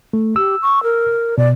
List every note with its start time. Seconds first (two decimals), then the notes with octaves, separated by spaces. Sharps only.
0.13 A3
0.36 G4 E6
0.62 C#6
0.83 A#4
1.38 B2 D5